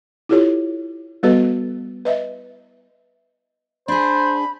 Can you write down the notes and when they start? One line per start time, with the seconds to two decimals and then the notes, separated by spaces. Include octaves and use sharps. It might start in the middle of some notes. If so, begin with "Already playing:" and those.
0.29 E4 F4 G4 A4 C#5
1.23 G3 B3 F#4 A4 B4 D#5
2.05 B4 D#5 E5
3.88 D4 G#4 C5 B5